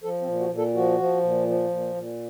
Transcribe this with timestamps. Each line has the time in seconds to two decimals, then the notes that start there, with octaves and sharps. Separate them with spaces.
0.03 F3 A4
0.21 C4
0.27 A#2
0.40 F#4
0.51 A#2
0.58 A4
0.75 F3 F#4
0.99 F3
1.23 A#2
1.47 F3
1.70 A#2
1.95 A#2